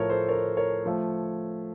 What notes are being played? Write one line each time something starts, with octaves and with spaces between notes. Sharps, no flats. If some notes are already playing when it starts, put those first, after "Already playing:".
Already playing: A2 F3 A3 A#4 C#5
A4 C5
A#4 C#5
A#4 C#5
F3 A3